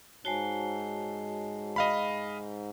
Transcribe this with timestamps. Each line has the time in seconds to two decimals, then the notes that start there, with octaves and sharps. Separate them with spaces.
0.25 G#2 F#4 C#5 G#5 A5 C7 G7
1.76 D#5 F5 B5